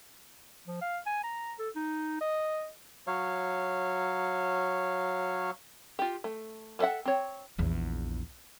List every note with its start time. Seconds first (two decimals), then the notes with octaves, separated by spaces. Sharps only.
0.67 F3
0.81 F5
1.06 G#5
1.24 A#5
1.59 A4
1.76 D#4
2.21 D#5
3.07 F#3 C#5 F5
5.99 F4 G4
6.24 A3
6.79 B3 A4 D5 E5 F#5
7.05 C4 C#5
7.59 A#1 E2